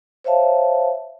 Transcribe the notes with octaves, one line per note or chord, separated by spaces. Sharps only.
C5 C#5 E5 F5 A5